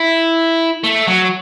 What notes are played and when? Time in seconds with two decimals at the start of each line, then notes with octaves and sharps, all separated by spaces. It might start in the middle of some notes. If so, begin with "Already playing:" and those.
Already playing: E4
0.84 A3
1.07 F#3